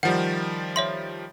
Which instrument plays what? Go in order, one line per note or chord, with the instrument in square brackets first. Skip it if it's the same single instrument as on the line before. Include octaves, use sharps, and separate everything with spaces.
[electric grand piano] D#3 F3 G3 [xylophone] F#5
[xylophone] C#5 E5 C6